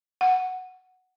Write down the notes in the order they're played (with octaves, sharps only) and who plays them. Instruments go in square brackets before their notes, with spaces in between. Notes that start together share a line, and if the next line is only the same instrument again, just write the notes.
[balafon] F#5